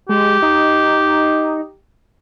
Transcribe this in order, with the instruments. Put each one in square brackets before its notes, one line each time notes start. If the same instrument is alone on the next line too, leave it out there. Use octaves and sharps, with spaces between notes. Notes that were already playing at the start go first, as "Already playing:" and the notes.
[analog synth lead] G#3 [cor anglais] G4
[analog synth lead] D#4